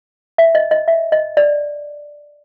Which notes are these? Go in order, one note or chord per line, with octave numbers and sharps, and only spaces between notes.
E5
D#5
D#5
E5
D#5
D5